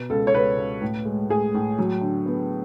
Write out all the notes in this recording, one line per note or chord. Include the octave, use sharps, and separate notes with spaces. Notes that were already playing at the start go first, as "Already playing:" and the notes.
Already playing: B2 B3
C#2 A4
C#5
C#2 B4
C#2
A2
G#3
A2 G#4
A2
F#3
D3
B3